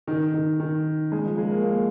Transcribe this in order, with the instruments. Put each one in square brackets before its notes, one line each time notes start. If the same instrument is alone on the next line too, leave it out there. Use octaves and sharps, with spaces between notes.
[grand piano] D#3
D#3
D#3
G#3
F3
G#3
A#3
A#3